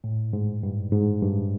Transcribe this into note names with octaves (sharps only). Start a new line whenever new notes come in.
A2
G#2
G2
G#2
G2